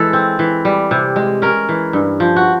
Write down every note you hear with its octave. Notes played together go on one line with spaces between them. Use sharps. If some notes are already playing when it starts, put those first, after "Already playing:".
Already playing: E3 G#3 A4
C4
E3
G3
C3
G#3
C#4 A#4
E3
G2
F3
F#4